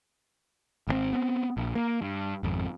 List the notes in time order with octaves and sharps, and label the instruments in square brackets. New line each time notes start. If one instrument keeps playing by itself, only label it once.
[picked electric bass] G#1 C#3 C4
B3 C4
A#1
A#3
G2
G#1 F2